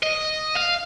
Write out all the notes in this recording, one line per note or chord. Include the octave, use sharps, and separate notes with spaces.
D#5
F5